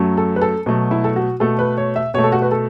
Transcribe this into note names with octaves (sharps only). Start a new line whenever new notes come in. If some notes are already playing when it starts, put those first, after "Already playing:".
Already playing: F#2 F#3 A3
A4
B4
A4
B2 F#3 A3
E4
A4
F#4
B2 A3 A4
B4
C#5
E5
B2 A3 C#5
A4
F#4
B4
A4